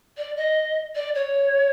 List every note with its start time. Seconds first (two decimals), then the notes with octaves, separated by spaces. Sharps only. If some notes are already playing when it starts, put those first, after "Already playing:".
0.17 D5
0.37 D#5
0.95 D5
1.15 C#5